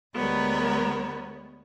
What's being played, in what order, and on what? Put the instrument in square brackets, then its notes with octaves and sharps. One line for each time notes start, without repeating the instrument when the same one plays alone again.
[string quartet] D2 G3 G#3 B3 A#4 C#5